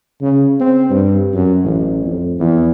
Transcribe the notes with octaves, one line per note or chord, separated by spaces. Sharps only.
C#3
C4
G2
F#2
A1
F2
E2